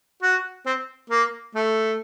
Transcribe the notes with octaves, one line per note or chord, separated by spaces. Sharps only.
F#4
C4
A#3
A3